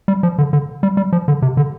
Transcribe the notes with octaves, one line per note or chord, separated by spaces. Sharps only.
G3
F3
D3
D3
G3
G3
F3
D3
C3
D3